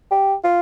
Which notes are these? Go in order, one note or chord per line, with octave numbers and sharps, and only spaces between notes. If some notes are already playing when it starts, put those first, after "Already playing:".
G4
F4